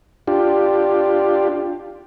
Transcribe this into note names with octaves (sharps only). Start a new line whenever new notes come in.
D4 F4 G4